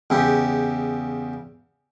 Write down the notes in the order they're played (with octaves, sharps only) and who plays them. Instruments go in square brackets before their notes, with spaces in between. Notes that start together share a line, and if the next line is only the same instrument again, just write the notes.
[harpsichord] E2 C#3 G4